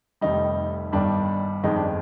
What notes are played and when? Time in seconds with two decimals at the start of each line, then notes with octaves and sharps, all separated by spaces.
0.21 F1 F2 D#3 G3 D#4
0.92 G1 G2 D#3 G3 D4
1.64 G1 F2 D#3 G#3 D#4
1.76 D4